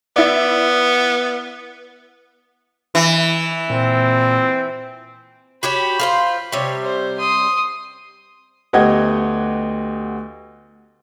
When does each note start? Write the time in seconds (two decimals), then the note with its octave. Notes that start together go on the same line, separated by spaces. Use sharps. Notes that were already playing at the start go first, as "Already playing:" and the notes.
0.16 B3 E4 D5
2.95 E3
3.70 A#2 C4
5.63 F#4 G4 C#5 B5
6.00 F4 A4 C5
6.52 C3 G3 C#5
6.84 C5
7.19 C6 D#6
8.73 D2 B3 G4 D#5 F#5 G#6